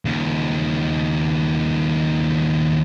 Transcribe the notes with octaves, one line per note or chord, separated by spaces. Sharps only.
D#2 C#3